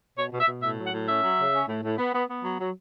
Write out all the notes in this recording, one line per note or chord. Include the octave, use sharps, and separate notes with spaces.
B2 C#5
B2
E5
B2
A2 E5
F#3
F#5
A2
C#4 E5
F#3
C#3
C#4
A2
A2
B3
B3
B3
F#3
F#3